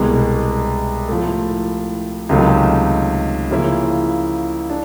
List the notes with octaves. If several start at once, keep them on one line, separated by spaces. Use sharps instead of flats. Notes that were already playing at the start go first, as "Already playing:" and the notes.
Already playing: C2 B2 G#3
A2 F3 A3
C#2 C3 D#3 F#3 A3
C#3 F3 A#3 C#4 E4
D4